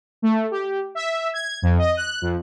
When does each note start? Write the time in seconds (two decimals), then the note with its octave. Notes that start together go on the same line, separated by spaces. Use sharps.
0.22 A3
0.51 G4
0.95 E5
1.34 G#6
1.62 F2
1.78 D#5
1.96 F#6
2.22 F2